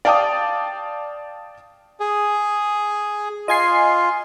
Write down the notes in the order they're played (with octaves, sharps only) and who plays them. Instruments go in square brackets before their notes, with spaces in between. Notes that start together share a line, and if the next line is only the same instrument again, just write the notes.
[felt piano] D5 F5 G5 A5 D6 D#6
[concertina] G#4
[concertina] F4 [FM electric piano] D#5 G#5 C7